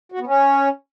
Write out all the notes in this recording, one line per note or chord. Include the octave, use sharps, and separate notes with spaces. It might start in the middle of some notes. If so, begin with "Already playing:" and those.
F#4
B3
C#4